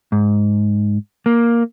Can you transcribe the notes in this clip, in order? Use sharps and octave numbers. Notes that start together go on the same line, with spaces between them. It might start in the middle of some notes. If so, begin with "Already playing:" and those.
G#2
A#3